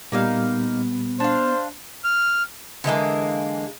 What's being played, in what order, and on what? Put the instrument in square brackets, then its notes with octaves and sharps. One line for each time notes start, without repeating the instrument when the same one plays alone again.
[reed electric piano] A#2 G3 [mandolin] A#3 D#4 F5 [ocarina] B3
[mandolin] D4 F5 [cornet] C5
[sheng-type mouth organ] F6
[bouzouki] D3 E3 G#3 A#3